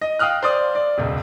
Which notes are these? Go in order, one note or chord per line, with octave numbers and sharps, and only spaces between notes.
D#5
F5 G5 D#6 F6 F#6
C5 D5 D#6
D5
E1 C#2